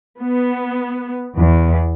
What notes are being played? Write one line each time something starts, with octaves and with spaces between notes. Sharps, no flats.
B3
E2